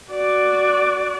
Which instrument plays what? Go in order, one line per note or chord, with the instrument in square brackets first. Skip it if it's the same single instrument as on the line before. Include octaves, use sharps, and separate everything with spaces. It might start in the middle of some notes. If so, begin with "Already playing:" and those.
[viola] F#4 D5